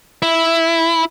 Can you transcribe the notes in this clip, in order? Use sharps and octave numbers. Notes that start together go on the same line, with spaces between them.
E4